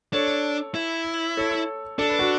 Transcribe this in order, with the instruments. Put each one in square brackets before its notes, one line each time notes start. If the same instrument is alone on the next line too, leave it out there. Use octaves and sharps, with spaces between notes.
[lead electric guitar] D4 [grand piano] A4 C#5
[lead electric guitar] E4
[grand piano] A4 C#5
[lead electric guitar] D4 [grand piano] A4
[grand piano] B4
F#4 A4